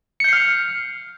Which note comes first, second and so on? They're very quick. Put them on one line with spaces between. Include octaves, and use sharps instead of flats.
C#7 G6 C7 F6